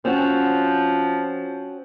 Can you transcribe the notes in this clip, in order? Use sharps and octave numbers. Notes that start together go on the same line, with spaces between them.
F3 C4 C#4 F#4